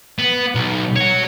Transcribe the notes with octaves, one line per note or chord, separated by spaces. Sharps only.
B3
B1
C#5 F#5